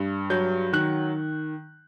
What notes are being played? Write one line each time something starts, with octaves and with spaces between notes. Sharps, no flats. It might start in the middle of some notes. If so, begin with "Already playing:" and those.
Already playing: G2
F#3 G6
D#3 F#6